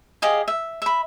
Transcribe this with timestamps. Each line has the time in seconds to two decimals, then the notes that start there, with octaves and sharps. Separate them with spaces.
0.22 G4 G#4 D#5 F5
0.48 E5
0.82 E5 B5